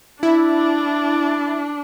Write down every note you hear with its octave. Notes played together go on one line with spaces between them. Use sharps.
D4 E4